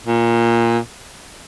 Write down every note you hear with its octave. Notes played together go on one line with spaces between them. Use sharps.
A#2